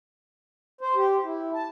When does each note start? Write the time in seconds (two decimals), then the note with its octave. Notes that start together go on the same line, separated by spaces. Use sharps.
0.81 C5
0.95 G4
1.24 E4
1.54 A5